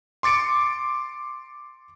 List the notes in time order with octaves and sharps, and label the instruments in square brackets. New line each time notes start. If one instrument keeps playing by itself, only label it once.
[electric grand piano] C6 D6 A6 C#7 D7